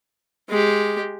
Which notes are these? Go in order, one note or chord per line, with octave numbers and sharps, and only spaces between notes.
G#3 G4